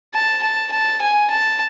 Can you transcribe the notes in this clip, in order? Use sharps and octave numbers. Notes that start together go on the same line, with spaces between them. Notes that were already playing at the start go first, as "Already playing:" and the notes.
A5
A5
A5
G#5
A5